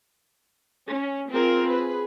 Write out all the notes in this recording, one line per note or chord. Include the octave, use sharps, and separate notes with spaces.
C#4
C4 F4 G#4 A#4
G#4 B4